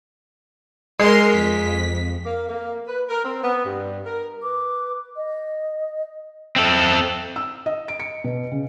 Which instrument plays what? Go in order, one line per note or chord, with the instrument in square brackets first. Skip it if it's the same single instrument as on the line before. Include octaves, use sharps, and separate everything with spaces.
[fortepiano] G#3 [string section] A#4 C6
[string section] F2 B6
[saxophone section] A#3
A#3
B4
A#4
C4
B3
G2
A#4
[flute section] B4 D6
D#5
[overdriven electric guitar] C4 A4 [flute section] E5
[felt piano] E6
D#5
D7
C#7
B2
C#3